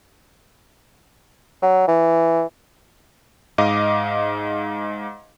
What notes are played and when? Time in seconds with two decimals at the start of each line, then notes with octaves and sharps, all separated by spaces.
1.62 F#3
1.88 E3
3.58 G#2 D#5 F5 D6